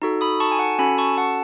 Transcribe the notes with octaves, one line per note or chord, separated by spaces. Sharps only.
D#4 F#4 A4
B5 D#6
A5 C#6
G#5
F#5 A5
C#4 F#4 A4 G#5 B5
A5 C#6
F#5 A5